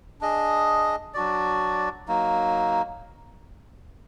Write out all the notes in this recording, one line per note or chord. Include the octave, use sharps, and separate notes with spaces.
D4 G#4 D#5
F#3 D4 F#4 D5
F#3 A#3 D#4